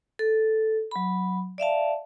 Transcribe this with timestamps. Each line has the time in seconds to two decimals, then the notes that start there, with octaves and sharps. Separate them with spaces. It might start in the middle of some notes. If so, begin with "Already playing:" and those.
0.19 A4
0.91 F#3 B5
1.58 D5 E5 F5 A5